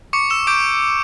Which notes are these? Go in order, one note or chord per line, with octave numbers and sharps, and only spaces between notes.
C#6 D6 C#7
E6 E7
D6 G6 D7